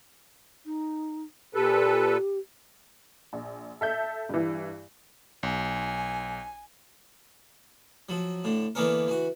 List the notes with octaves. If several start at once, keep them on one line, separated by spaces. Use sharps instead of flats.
D#4
A#2 G4 A4 B4
A#1
A4 E5 G6
G2 E3
B1 G#5
F3 F#3
A2 D3
D3 E3 A#3 B3 C#4 A#4
E3 F#4